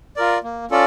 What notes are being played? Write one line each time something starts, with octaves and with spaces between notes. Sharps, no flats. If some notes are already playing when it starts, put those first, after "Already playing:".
F4 A#4 D5
A#3
C#4 F4 A4 D5